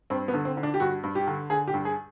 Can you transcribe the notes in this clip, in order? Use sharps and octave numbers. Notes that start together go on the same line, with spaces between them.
G2 C4
B3
D3
C4
D3
D4
G4
G2 F#4
G2
G4
D3
D3 G#4
G4
G2
G#4